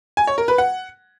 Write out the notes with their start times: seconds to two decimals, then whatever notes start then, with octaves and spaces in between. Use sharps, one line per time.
0.17 G#5
0.27 C#5
0.38 A#4
0.48 B4
0.58 F#5